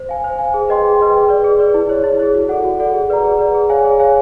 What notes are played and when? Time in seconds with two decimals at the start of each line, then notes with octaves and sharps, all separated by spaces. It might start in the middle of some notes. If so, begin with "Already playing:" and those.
Already playing: C5
0.09 F5 G#5
0.24 C5
0.39 F5 G#5
0.54 G#4
0.69 B4 D#5 G5 C6
0.84 G#4
0.98 B4 D#5 G5 C6
1.15 G#4
1.28 B4 D5
1.44 G#4
1.59 B4 D5
1.74 E4
1.89 G#4 C#5
2.04 E4
2.19 G#4 C#5
2.35 F#4
2.49 A4 D5 F#5
2.64 F#4
2.80 A4 D5 F#5
2.94 G#4
3.10 B4 D5 F#5 A#5
3.24 G#4
3.39 B4 D5 F#5 A#5
3.55 G#4
3.70 C#5 F5 G#5
3.85 G#4
4.00 C#5 F5 G#5